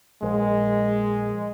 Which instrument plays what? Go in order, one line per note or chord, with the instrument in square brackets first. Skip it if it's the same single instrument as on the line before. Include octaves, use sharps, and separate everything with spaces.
[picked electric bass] A#1 [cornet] G#3